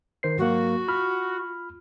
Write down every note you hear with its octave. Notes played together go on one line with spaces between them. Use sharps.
D#3 C5 C7
G#2 F#3 A#3 F#4
F4 B5 F6